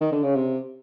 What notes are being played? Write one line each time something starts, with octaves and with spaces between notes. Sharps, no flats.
D#3
D3
C#3
C3